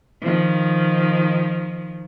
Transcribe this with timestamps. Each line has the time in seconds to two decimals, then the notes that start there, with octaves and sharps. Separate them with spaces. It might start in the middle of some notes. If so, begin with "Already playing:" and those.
0.22 D#3 F3